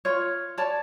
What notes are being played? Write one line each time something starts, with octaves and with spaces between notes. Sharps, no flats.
F4 C#5
C#5 D5 A5